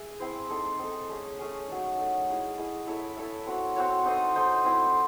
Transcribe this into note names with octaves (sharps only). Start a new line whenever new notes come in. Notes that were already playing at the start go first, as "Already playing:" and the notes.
Already playing: G#4 E5
C4 E4 C5
C4 D#4 A4
C4 D#4 A4
A3 C#4 G#4
A3 C#4 G#4
F#3 A3 D#4
F#3 A3 D#4
E4 G#4 D#5
E4 G#4 D#5
E4 A4 C#5 E5
E4 A4 C#5 E5
C4 F#4 C#5
C4 F#4 C#5
D#4 A4 C5 D#5
D#4 A4 C5 D#5
C4 E4 C5